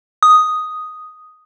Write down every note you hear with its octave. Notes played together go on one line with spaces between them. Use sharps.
D#6